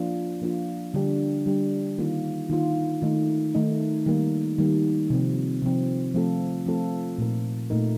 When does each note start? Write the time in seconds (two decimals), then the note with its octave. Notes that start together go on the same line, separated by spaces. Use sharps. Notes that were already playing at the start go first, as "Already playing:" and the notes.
Already playing: F3 A#3 D4 F4
0.42 F3 A#3 D4 F4
0.94 D3 G3 D4 G4
1.46 D3 G3 D4 G4
1.98 D#3 A#3 F4
2.50 D#3 A#3 F4
3.02 D#3 A3 D#4
3.55 D#3 A3 D#4
4.06 D#3 G3 A#3
4.58 D#3 G3 A#3
5.10 C3 F3 C4
5.62 C3 F3 C4
6.14 F3 A3 C4 F4 A4
6.66 F3 A3 C4 F4 A4
7.18 A#2 A3 D#4 A#4
7.70 A#2 A3 D#4 A#4